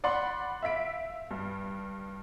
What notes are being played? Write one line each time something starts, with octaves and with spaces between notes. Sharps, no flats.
D5 F#5 B5 C6
E5 F5 B6 D7
G2